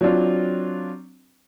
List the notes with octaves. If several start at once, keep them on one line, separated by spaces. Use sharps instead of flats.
F#3 C4 D4 F4